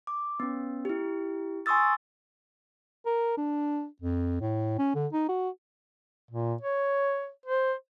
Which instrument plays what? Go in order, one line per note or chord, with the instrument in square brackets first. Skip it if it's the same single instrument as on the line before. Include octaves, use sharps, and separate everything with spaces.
[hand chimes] D6
B3 C#4
E4 G4
G#5 C6 C#6 D#6 E6 A6
[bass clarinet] A#4
D4
F2
A2
C#4
D3
D#4
F#4
[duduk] A#2
C#5
C5